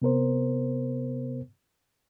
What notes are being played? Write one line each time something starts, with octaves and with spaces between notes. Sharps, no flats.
C3 B3 A#4 C5